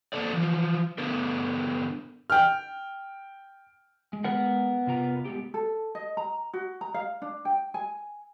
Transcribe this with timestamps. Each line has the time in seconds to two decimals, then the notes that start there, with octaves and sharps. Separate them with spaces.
0.13 A#3 C4 A4 D5
0.33 E3 F3
0.98 D3 B3 A#4
2.30 G5 F6
4.13 G#3
4.24 B3 A#4 F#5
4.87 C3 F4 A#5
5.25 G#3 B3 G4
5.54 A4
5.95 D#5
6.17 A#5
6.53 F#4
6.81 A#5
6.94 F5
7.22 D4
7.45 G5
7.74 G#5